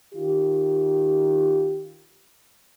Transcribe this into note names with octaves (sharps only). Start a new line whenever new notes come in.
D#3 F4 G4